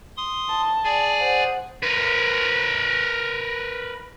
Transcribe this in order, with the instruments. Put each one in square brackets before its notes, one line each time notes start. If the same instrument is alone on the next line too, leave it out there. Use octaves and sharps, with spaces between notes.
[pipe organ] C6 D#6
[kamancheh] A5
[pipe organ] G#4 D5 G#5
[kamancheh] C5 F#5
[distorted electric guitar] A#4 B4